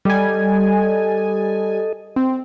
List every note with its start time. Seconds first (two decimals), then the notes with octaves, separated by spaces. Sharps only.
0.05 G3 A4 D#5 G#5
2.16 C4